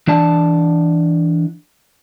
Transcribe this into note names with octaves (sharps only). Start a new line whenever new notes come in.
E3 D4 D5 A5